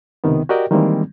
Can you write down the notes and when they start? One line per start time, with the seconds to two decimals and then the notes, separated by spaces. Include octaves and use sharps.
0.24 C#2 C3 D#3 B3
0.49 F#4 G4 A#4 D5 D#5 G5
0.71 D#3 E3 G3 G#3 A#3 C4